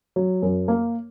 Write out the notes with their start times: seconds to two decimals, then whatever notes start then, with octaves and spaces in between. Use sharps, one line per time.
0.16 F#3
0.42 F#2
0.68 A#3